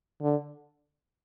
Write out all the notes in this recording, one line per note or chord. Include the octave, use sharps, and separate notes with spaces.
D3